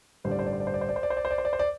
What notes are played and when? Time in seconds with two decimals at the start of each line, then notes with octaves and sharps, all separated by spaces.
0.24 A1 G2 D3 G3 C5
0.31 D5
0.39 C5
0.46 D5
0.53 C5
0.60 D5
0.67 C5
0.74 D5
0.81 C5
0.89 D5
0.96 C5
1.03 D5
1.10 C5
1.17 D5
1.25 C5
1.31 D5
1.38 C5
1.45 D5
1.53 C5
1.59 D5